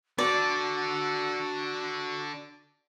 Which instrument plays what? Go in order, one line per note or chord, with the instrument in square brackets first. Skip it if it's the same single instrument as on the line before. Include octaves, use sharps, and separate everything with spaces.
[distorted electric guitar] D4 A4 [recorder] F#4 [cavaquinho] D5